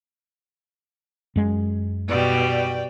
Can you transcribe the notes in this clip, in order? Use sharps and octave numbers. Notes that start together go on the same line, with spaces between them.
F#2 G#3
B2 G3 D5 G5